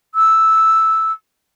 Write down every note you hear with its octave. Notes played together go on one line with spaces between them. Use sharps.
E6